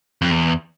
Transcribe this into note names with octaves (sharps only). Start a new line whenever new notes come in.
F2
E2